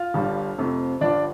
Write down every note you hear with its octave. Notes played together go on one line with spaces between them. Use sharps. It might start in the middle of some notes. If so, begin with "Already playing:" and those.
Already playing: F4 F5
G1 G2 G3
F2 C3 A3
G1 G2 F3 D4 D5